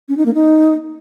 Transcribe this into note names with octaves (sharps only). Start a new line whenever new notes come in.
C#4
D#4
A#3
D#4